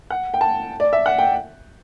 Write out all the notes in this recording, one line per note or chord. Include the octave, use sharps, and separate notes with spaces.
F#5
G5
A5
D5
E5
F#5
G5